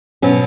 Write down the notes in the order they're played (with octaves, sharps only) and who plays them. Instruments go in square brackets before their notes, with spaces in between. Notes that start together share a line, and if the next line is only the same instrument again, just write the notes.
[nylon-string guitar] B2 F#3 C#4